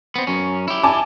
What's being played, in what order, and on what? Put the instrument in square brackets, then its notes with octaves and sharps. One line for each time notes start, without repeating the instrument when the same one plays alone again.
[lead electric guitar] B3 C4
F#2 C#4
E4 G4
[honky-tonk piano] G#5 A5 D6